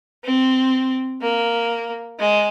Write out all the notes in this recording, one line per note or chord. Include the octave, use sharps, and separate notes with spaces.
C4
A#3
G#3